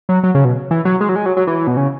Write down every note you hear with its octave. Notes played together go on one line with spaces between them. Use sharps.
F#3
F#3
C#3
B2
E3
F#3
G#3
F#3
G#3
F#3
F#3
E3
B2
C#3